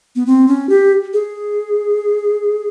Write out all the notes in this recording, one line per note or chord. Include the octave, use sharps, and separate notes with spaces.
B3
C4
C#4
G4
G#4